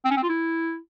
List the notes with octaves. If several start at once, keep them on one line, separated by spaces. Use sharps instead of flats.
C4
C#4
C4
F4
E4